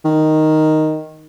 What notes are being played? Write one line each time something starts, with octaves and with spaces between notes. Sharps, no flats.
D#3